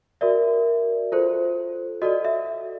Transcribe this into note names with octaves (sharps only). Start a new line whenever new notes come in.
F#4 A#4 D5 E5
F4 A4 C5
F#4 A4 D5 D#5
E5